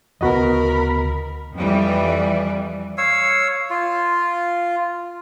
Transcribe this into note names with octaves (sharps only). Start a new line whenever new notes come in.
D2 C#3 E3 B3 F#4 A#4 D#5 B5
F2 E3 G3 D5
C#5 F5 E6
F4